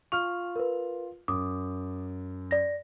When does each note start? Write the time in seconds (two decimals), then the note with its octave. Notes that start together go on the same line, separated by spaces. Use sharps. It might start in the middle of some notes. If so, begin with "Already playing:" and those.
0.12 F4 C#6 F6 F7
0.56 A#4 B4
1.28 F#2 D6 D#6
2.51 D5 A#6